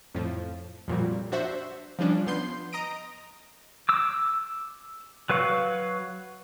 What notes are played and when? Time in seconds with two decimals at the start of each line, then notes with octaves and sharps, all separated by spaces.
0.14 F2 A2 F3
0.88 F2 A#2 F#3 G3
1.32 D4 F#4 C5 E5
1.99 F3 G3 C#4 D4
2.27 F3 B3 C6 G6 C7
2.73 D#5 A#5 D#6 A#6 D7
3.89 D6 E6
5.30 F#3 B4 F5 C#6